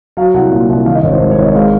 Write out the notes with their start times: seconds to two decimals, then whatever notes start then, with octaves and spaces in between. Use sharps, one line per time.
0.17 F#3 F5
0.34 C2 F#5
0.51 A#2
0.69 C2
0.86 D#3 F5
0.94 D#5
1.03 G#1 C#5
1.12 C5
1.20 G#2 C#5
1.31 C#5
1.38 G#1
1.43 D#5
1.55 G#3 F5